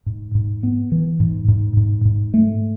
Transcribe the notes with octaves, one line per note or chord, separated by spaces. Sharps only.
G#2
G#2
B3
E3
G#2
G#2
G#2
G#2
A3